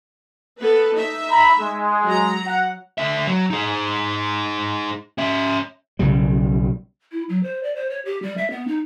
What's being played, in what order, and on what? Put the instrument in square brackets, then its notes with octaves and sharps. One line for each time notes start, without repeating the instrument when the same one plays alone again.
[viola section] B3 A4 B4
D#4 E5
[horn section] A#5 B5
G#3
[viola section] F#3 A#5
[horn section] F#5
[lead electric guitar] D3 E5
F#3
D#4 G#4
C#4 E5
[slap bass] B1 C#3 G3
[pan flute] E4
F#3
C5
D5
C5
C#5
G4
G3
E5
B3
D#4